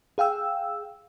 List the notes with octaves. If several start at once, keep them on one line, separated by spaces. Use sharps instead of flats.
G#4 F5 G5 E6